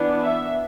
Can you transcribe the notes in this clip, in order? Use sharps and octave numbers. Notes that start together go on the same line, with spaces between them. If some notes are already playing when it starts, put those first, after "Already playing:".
Already playing: E3 B3 D4
E5